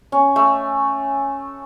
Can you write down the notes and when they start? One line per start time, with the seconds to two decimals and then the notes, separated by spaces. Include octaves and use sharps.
0.12 C#4
0.36 A3